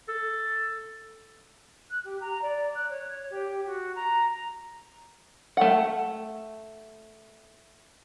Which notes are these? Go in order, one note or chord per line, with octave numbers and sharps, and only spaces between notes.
A4
F#6
G4
A#5
D5
F#6
C#5
G4
F#4
A#5
A3 F#5